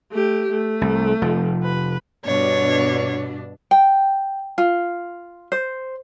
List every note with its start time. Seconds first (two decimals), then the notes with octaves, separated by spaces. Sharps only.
0.12 A3 G4
0.52 A3
0.81 C2
1.22 F1 F3
1.63 B4
2.25 G2 B2 D4 C#5
3.71 G5
4.58 F4
5.52 C5